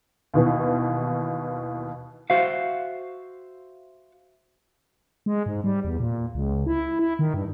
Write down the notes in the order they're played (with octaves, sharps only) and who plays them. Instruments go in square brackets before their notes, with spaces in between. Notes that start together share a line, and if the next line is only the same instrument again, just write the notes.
[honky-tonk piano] D#2 B2 E3
[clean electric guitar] F#4 C5 E5 F5
[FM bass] G#3
G#2
G3
E2
A#2
C#2
E4
E4
D#3
G2